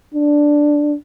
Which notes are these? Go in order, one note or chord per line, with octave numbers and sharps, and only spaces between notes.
D4